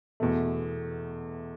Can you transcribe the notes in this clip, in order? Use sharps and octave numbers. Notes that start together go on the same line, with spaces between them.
E2 B2 A3